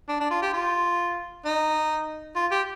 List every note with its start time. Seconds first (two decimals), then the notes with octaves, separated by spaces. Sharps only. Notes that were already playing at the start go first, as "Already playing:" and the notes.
0.08 D4
0.20 D4
0.30 F4
0.42 G4
0.53 F4
1.45 D#4
2.35 F4
2.51 G4